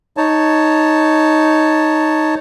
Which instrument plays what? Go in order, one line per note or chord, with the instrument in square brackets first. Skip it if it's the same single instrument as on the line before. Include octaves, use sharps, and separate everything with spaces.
[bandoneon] D#4 C#5 A5